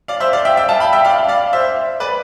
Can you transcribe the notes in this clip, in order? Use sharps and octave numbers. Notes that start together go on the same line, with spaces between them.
D5 F5
C5 E5
D5 F5
E5 G5
E5 G5
F5 A5
G5 B5
E5 G5
D5 F5
D5 F5
C5 E5
B4 D5